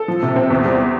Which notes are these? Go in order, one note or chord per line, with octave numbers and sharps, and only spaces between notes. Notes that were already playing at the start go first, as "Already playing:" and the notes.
Already playing: A4
F3
C3
C4
E2
G3